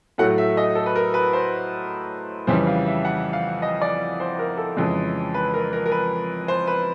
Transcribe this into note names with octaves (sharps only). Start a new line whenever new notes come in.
A2 F#3 A3 F#5
E5
D#5
A4
B4
A#4
B4
C5
F2 C#3 E3 G3 C5
F5
E5
F#5
F5
D#5
D5
C5
A#4
A4
F2 C#3 E3 G#3
B4
A#4
A#4
A#4
B4
C5
B4